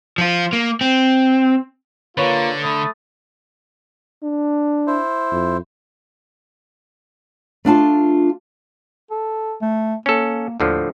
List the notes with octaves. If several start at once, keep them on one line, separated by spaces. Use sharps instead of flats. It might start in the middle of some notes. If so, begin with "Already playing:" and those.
F3 F4
A#3
C4
D3 A#3 F4 B4 C#5
A3 B5 D#6
D4
E4 C5
F2
A3 D4 F4 A5
A4
A3
A#3 C#4 A4
D#2 A2 D3 F3